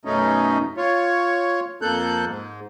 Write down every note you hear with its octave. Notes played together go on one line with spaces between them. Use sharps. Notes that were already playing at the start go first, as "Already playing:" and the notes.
F#2 B2 A3 C#4 D#4
F4 C#5
F2 A#3 A4 F#6 G6
G#2